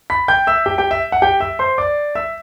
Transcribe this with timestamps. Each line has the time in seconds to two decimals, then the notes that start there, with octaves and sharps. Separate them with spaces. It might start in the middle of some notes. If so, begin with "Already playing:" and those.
0.10 B5 B6
0.28 G5 G6
0.47 E5 E6
0.66 G4 G5
0.78 G4 G5
0.91 E5
1.12 F#5
1.22 G4 G5
1.40 E5 E6
1.59 C5 C6
1.78 D5 D6
2.15 E5 E6